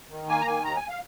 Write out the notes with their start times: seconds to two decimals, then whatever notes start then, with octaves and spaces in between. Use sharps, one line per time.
0.10 D#3
0.29 A#3 G#5
0.41 A#5
0.47 D#3 G#5
0.65 D#2 A#5
0.77 G#5
0.89 F5